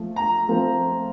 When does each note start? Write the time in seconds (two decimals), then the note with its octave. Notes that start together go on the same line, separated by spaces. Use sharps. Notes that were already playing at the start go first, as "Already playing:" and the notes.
Already playing: F3 A3
0.16 A#5
0.48 F3 A3 C4 F4